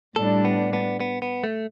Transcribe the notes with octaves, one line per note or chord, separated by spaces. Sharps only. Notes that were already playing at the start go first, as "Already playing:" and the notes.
A2 G3 D4 A4
B3
B3
B3
B3
A3